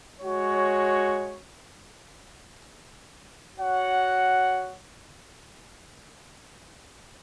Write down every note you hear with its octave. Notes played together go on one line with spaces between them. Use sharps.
G#3 F#4 C#5
F#4 C#5 F#5